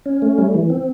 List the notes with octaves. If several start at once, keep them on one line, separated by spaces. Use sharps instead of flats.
C#4
A3
G3
E3
C4